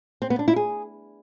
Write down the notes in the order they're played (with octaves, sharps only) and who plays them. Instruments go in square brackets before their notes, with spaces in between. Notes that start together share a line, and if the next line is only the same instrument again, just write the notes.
[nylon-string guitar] C4
B3
D4
E4
G#4